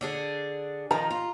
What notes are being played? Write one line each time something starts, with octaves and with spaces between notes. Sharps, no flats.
D3 D4 G#4
D#3 F3 A#5
F4